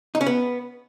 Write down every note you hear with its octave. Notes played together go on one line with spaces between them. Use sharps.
D#4
C#4
B3